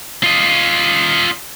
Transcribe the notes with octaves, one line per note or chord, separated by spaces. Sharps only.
F4 D#5